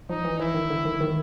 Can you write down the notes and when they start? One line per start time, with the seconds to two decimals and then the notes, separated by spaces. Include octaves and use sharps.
0.09 F3 D#4
0.25 E3
0.40 E3 E4
0.54 D#3
0.70 D3
0.85 D#3
1.01 D#3